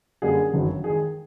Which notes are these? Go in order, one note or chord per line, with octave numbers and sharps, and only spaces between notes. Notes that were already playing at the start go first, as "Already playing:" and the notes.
F#2 D3 G3 A#3 G#4
G1 F#2 D#3 F#3
D#2 D#3 G#3 G#4